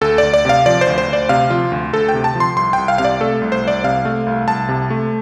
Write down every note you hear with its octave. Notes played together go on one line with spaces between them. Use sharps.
D2 A4
D2 D5
D5
C3 F5
F3 D5
C5
D2
C5
D2
D5
C3 F5
F3 F4
D2
D2 A4
G5
C3
A5
F3
C6
C2 C6
C2 G5
F5
C3 F5
D5
A3 A4
C2
C5
C2 D5
C3 F5
A3
C2
C2 A5
C3
A3